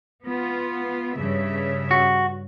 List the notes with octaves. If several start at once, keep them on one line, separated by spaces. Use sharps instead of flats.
B3 F4
G2 C#3 E5
F#4